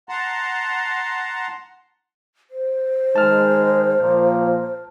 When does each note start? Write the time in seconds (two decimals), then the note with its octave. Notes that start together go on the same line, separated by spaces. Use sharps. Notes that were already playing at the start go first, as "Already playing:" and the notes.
0.09 F#5 A5 A#5 C6
2.50 C5
3.16 D#3 G#3 A5 F6
3.99 A#2 F3 A#3